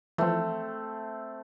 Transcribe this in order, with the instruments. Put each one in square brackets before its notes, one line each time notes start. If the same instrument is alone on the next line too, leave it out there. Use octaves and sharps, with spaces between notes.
[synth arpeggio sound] E3 F3 [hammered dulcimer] A3 C4